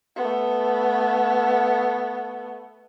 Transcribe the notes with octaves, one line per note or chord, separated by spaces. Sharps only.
A3 B3